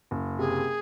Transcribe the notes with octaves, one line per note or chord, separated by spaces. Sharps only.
F#1
C3 G#4